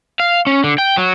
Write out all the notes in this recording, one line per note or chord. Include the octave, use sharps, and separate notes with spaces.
F5
C#4
D3
G5
F#3